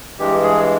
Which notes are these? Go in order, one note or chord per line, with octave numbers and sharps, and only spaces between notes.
G2 E3 G#3 G4
G#4